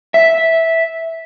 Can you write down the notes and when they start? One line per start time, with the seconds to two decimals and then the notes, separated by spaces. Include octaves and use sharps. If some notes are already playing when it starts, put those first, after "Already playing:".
0.14 E5